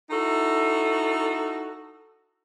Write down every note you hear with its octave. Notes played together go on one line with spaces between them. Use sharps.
D#4 E4 F#4 A4